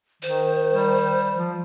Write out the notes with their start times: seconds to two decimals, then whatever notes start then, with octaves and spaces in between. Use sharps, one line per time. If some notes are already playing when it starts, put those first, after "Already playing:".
0.23 D#3 C5
0.73 G3
1.35 F3